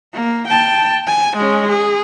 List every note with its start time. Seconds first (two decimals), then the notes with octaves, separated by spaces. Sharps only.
0.14 A#3
0.48 G5 A5
1.07 G#5
1.36 G#3 C#4
1.69 G#4